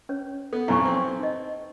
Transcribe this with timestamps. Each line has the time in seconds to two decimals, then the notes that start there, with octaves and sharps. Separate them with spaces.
0.09 C#4 C#5
0.53 B3 A4
0.68 B1 F2 E4 G#5 C#6
0.85 C4
1.19 D#4 D#5